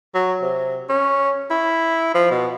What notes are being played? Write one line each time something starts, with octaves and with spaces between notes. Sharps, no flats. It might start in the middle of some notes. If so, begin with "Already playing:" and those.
F#3
C3
C#4
E4
F3
B2